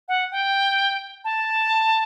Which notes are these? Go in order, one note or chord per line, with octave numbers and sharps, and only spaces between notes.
F#5
G5
A5